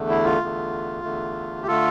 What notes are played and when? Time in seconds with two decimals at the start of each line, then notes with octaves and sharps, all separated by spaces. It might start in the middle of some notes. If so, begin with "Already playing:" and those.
Already playing: E2 D3 A3
0.09 E4
0.25 F4
0.41 E2 D3 A3
1.04 E2 D3 A3
1.61 G4
1.67 D3 A3 F4 A4